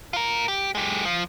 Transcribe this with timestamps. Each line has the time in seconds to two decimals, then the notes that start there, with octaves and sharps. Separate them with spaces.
0.13 F4 A#4
0.48 G4
0.75 G#3 G4
1.05 F3